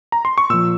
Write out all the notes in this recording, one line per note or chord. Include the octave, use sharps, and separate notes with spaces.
A#5
C6
C#6
A#2 F3 E6